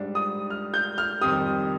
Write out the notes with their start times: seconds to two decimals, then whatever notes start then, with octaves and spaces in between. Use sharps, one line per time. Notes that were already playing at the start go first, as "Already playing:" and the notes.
Already playing: G#2 G3 D4
0.15 D#6
0.50 F6
0.74 G6
0.98 F6
1.21 F2 D#3 G3 C4 G4 D#6